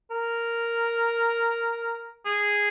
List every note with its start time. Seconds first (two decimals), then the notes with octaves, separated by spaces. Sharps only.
0.11 A#4
2.26 G#4